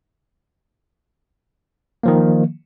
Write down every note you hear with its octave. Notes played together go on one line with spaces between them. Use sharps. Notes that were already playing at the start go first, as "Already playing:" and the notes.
D#3 F3 A#3